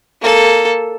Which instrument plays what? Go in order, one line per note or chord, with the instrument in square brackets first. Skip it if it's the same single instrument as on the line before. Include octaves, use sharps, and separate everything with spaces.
[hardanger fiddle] A#3 A4